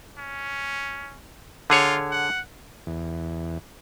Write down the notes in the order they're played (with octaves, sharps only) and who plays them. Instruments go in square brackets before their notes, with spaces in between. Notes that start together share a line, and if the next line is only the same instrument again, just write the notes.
[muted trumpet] C#4
[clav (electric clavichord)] D3 G#4 C#5 [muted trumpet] F4
[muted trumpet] F#5
[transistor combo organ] E2